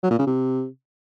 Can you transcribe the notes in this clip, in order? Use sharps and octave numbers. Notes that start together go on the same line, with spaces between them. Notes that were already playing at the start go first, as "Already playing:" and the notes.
F#3
A#2
C#3
C3